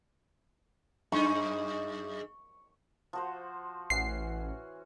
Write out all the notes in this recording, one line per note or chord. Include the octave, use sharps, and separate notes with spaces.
F#2 G#3 D#4 C#6
F3 F#4 C5
A1 E3 C#4 F#4 C7